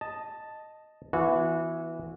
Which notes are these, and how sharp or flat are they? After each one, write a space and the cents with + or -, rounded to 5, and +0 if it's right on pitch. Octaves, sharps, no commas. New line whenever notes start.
D#5 +0 A5 +0
E3 +0 B3 +0 F#4 -25